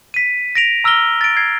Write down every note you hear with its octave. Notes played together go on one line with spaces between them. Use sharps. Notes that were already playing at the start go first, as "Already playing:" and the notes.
B6 D#7
A#6 D7 F7
A#5 E6 F6 A#6 G7
A6 D7
G#6 C7